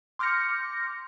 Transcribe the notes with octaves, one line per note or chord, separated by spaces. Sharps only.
C6 D6 F6 G6 A#6 C#7